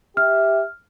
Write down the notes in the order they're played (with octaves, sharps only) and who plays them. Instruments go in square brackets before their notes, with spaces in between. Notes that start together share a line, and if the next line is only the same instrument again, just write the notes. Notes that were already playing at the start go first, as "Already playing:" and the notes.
[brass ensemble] G4 E5 [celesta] F6